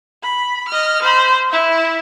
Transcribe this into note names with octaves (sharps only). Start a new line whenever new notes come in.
B5
D#5 F6
C5 B5
E4 E5